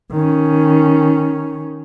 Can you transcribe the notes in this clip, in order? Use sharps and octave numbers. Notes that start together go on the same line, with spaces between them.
D#3 C#4